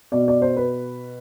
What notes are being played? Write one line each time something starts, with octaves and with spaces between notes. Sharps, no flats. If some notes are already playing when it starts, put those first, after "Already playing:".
B2 D5
D5
C5
B4